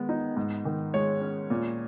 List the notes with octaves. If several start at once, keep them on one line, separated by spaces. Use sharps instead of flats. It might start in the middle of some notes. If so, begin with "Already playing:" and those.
Already playing: D#3 G#3 B3
D#4
G#2
D#3
G#3 C#5
C#4
A#2